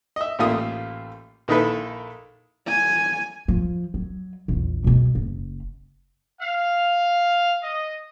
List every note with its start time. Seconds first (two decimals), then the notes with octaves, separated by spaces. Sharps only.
0.16 D#5 E5
0.39 A1 A#2 A3 A#3 F4 D#6
1.48 A#1 D#3 D#4 E4 A4 B4
2.68 G#5
3.48 F3
3.94 F#3
4.48 A#1 E2
4.84 B2 G#3
5.15 F#1
6.40 F5
7.63 D#5